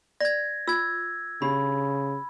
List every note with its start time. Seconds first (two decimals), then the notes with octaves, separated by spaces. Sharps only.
0.21 D5 G#6 A#6
0.68 F4 E6 G#6
1.42 C#3 D4 G4 B5